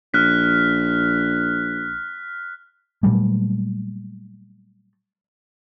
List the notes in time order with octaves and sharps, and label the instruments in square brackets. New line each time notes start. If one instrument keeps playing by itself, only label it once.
[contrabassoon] A#1 [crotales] F6 F#6 B6
[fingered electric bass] A#2 F#3 G3 A3